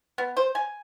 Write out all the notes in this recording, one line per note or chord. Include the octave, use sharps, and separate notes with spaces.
B3
C5
G#5